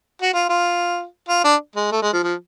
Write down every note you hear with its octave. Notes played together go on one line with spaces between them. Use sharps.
F#4
F4
F4
F4
D4
G#3
A3
G#3
F3
F3